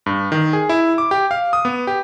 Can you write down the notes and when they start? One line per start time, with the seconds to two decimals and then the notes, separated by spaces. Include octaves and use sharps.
0.06 G2
0.32 D#3
0.53 G#4
0.69 E4
0.98 D6
1.11 G4
1.31 F5
1.53 D#6
1.65 B3
1.87 G4